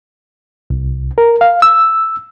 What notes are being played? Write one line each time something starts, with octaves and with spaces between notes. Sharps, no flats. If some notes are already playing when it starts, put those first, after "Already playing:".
C2
A#4
F5
E6